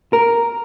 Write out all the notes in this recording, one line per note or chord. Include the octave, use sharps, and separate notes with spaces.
A#4